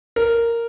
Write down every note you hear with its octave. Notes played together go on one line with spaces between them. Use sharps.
A#4